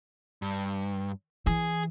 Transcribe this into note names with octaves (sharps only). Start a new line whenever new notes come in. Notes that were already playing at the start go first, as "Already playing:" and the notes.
G2
E3 G#4